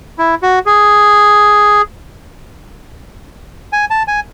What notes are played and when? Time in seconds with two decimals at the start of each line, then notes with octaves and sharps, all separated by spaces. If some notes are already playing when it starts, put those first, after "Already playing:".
0.18 E4
0.43 F#4
0.66 G#4
3.73 G#5
3.90 A5
4.08 G#5